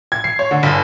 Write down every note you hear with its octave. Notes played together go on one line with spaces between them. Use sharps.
G#6
C7
C#5
D3
G1